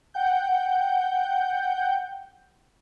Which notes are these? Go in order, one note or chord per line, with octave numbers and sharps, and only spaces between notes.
F#5 G5 G6